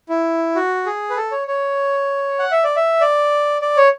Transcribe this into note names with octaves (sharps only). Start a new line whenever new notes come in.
E4
F#4
G#4
B4
A4
C#5
C#5
F#5
E5
D5
E5
D5
D5
C#5